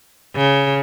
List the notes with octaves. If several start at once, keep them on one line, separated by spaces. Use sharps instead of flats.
C#3